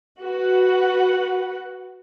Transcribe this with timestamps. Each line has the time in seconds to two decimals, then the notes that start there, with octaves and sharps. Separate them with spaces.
0.20 F#4 B4 F#5